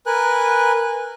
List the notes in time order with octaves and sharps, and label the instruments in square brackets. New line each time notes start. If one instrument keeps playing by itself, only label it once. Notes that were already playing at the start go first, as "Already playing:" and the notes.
[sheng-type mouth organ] A#4 B4 G#5 F#6